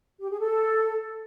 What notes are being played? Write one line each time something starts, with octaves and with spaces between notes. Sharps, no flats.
G4
G#4
A4